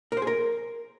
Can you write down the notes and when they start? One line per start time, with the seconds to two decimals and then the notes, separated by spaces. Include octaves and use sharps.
0.12 A#4
0.17 C5
0.22 G#4
0.27 A#4